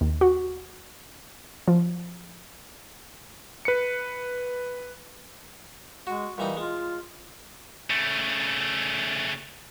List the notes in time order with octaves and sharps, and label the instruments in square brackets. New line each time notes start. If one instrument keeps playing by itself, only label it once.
[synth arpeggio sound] D#2
F#4
F3
[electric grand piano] B4 C#7
[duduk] G#3 [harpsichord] F#4
[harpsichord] A#2 E3 D#4 [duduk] G3
[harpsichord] G#3 [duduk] F4
[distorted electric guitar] C#3 A3